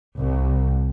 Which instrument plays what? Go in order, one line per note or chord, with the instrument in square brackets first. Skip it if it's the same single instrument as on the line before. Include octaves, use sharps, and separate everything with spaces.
[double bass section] C2